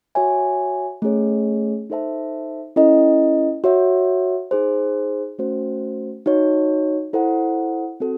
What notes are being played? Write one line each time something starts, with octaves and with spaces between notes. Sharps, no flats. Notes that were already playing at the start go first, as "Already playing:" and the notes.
F#4 C#5 E5 G#5
A3 C#4 G#4 C#5
D#4 A4 C5 E5 A5
C#4 E4 A4 D#5
F#4 C#5 E5
D#4 G#4 C5
A3 C#4 F#4 C5
D#4 F#4 C#5
E4 A4 C5 F#5
C4 F#4 A4